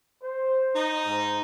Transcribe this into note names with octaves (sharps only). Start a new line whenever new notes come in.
C5
D#4
G#2